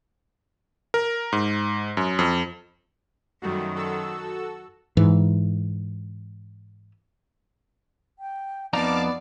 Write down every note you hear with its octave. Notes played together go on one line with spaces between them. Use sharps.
A#4
G#2
F#2
F2
F#2 D#3 G3 A3 F#4
F#4 A4 E6
G#2 E3
G5
F2 B3 D#4 D5 F5 A5 A#5 D6